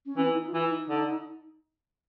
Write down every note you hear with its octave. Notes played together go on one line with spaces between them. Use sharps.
C#4
E3 C4
E4
D#4
F4
E3 E4
D#4
D3